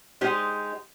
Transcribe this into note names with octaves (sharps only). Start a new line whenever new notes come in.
G#3 D#4 G4 C5